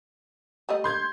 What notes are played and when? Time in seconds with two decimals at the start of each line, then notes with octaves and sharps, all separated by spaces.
0.69 G3 A3 D#5
0.84 C6 G6 G#6